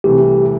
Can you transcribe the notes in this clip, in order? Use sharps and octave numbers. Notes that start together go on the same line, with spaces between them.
C2 C3 E3 A3 G4